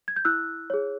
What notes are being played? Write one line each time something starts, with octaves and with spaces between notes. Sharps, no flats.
G#6
G6
E4 E6 F#6
G#4 C#5